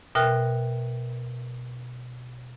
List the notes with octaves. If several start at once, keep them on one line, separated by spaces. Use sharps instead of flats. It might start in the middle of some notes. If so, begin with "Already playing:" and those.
B2 A#4 E5 G5 F6 F#6